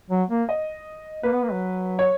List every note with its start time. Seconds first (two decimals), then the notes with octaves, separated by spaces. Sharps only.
0.10 F#3
0.30 A#3
0.49 D#5
1.23 A#3 B4
1.33 B3
1.42 A#3
1.52 F#3
1.99 C#5